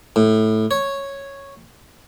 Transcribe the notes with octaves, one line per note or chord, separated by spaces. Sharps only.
A2
C#5